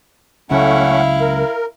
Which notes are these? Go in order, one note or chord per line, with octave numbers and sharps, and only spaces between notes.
C#2 C#3 F#3 A3 C#4 E4 F5 F#5
A#4